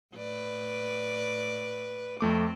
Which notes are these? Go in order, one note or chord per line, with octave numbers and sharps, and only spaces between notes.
A2 B4 D5
F2 A3 C4 D6